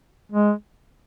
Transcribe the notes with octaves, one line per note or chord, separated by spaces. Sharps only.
G#3